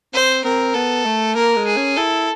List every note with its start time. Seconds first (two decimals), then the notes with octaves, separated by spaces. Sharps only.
0.13 C4 C5
0.44 C4 A#4
0.74 B3 A4
1.05 A3
1.35 A#3 A#4
1.56 G#3
1.66 G#4
1.76 C#4
1.96 E4 A4